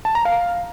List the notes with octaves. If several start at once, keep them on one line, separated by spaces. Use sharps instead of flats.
A5
A#5
F5